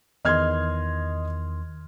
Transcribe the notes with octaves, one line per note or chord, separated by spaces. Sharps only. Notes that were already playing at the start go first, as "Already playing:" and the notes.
E2 D#3 D#5 C6 F6 G#6